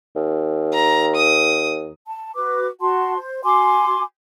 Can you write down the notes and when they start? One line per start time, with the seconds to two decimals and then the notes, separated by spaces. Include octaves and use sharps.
0.16 D#2
0.73 A#5
1.16 D#6
2.07 A5
2.35 F#4 B4 D6
2.80 F#4 F#5 A5 C6
3.17 C5
3.44 F#4 G#5 C6 D6